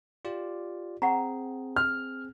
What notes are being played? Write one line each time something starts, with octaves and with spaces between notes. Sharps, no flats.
F4 G4 D5
C4 G#4 F#5 A#5
F6